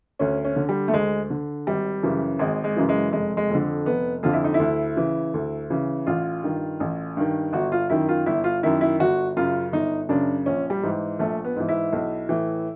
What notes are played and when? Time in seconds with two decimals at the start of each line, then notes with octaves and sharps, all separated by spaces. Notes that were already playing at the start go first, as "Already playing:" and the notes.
0.19 D2 C#4
0.45 C#4
0.56 D3
0.69 G3
0.88 A3
0.93 D2 G#3
1.30 D3
1.67 G#1 G3
2.03 F#2 C#3 E3
2.39 G#1 G#3
2.64 G#3
2.76 F#2 C#3 E3
2.89 G#3
3.13 F1 G#3
3.37 G#3
3.50 F2 D3
3.86 F1 B3
4.23 F2 D3 F4
4.33 E4
4.44 D#4
4.54 E4
4.60 D2
4.96 C#3 E3
5.34 D2
5.70 C#3 E3
6.07 A1 F4
6.44 G2 D#3
6.80 A1
7.17 G2 D#3
7.53 G1 F#4
7.72 F4
7.90 F#2 D#3 E4
8.09 F4
8.26 G1 E4
8.44 F4
8.63 F#2 D#3 E4
8.81 E4
9.00 G1 F#4
9.37 F#2 C#3 F4
9.72 G1 D#4
10.09 F#2 C#3 D4
10.46 A#1 C#4
10.70 G3
10.83 G#2 E3
11.19 A#1 A3
11.45 B3
11.56 G#2 E3
11.69 E4
11.93 B1
12.29 A2 E3